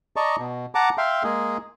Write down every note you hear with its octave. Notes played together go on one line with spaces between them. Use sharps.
D5 D#5 A5 A#5 C#6
B2
F#5 A5 A#5 D6
E5 F5 G5 C6
G#3 A#3 G#4